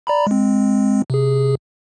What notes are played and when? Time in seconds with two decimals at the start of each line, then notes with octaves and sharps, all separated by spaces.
0.07 D5 A#5 B5
0.27 G#3 C4
1.10 C3 G#4